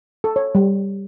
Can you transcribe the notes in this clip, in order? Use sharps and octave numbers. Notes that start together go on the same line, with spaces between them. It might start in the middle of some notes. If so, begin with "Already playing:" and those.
A4
C#5
G3